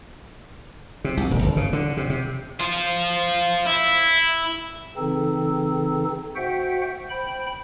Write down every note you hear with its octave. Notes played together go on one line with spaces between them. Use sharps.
C3
C2
D#1
G1
C#3
D3
C3
C3
F4 C5
E4 E5
C#3 E3 C4 D#4 A4
F#4 C5 E5 F#5 G5
C5 G5 B5